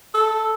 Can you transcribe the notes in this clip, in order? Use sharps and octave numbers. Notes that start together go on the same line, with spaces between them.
A4